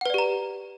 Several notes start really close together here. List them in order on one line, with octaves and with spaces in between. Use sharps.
F#5 B4 D5 G4 A#5